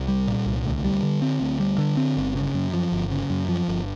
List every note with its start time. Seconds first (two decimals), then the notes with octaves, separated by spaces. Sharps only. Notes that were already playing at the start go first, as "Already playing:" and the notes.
Already playing: C2
0.08 G3
0.28 A#2
0.46 C2
0.65 D2
0.84 G3
1.03 D3
1.22 C4
1.41 D2
1.60 G3
1.78 D3
1.97 C4
2.17 G1
2.35 C#3
2.54 F#2
2.73 F3
2.92 G1
3.11 C#3
3.30 F#2
3.49 F3
3.68 G1